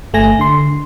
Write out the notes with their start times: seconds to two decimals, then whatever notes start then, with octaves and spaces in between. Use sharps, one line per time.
0.13 G1 A3 G#5 A#6
0.39 D3 C6